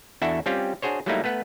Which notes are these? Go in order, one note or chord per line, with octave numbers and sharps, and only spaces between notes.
E2 D4 E4 F#4 A4 E5
G3 C4 C#4 F4 G4
D4 F#4 G#4 C5 C#5
F#3 G3 A3 A#3 D#4 E4
A3 B3 B4 F#5